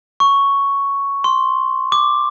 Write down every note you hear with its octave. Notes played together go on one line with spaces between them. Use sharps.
C#6
C6
D6